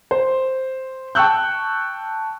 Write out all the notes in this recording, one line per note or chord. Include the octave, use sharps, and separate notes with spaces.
C5
G5 A5 C#6 E6 F#6 G6